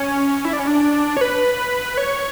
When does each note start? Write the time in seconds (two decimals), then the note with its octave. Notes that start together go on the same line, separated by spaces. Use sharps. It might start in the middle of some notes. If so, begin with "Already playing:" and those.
Already playing: C#4
0.45 E4
0.53 D4
0.59 C#4
0.67 D4
1.17 C#5
1.21 B4
1.97 C#5